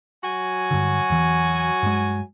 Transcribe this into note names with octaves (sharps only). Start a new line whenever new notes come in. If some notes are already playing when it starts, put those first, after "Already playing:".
F#3 F#4 G#5
G2 D3
E2 E3
G2 G#3